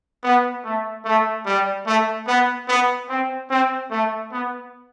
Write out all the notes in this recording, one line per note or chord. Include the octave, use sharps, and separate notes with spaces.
B3
A3
A3
G3
A3
B3
B3
C4
C4
A3
B3